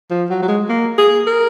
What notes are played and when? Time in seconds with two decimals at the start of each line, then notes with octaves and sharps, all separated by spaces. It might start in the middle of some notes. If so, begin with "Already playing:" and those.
0.10 F3
0.30 F#3
0.42 F#3
0.48 G#3
0.69 A#3
0.98 G#4
1.27 A#4